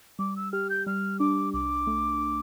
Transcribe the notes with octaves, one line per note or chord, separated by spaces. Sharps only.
G3 D6
E6
G4 F6
G6
G3 F6
D4 D6
C2 D6
A3